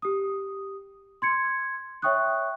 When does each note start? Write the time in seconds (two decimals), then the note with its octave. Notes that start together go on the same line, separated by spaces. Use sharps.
0.02 G4 D#6
1.22 C6 G#6 C#7
2.02 C#5 E5 G5 C#6 D#6 F#6